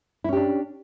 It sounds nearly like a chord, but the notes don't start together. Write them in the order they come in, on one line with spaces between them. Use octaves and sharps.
E4 C#4 G4 D4